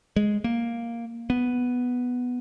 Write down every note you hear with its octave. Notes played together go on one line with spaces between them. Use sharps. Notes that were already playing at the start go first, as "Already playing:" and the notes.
G#3
A#3
B3